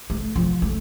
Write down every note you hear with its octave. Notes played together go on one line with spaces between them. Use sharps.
A3
F3
A3